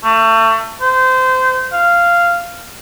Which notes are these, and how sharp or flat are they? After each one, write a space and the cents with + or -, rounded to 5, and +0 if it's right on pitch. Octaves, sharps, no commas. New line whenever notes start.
A3 +30
C5 -25
F5 -10